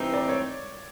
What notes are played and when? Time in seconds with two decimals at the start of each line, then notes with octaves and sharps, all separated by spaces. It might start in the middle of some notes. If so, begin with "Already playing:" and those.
Already playing: G2 E3 A3 C4 D#4
0.14 D5
0.29 C#5